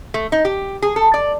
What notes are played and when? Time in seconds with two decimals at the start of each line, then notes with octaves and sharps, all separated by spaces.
0.14 A3
0.32 D#4
0.45 G4
0.82 G#4
0.96 A4
1.14 D5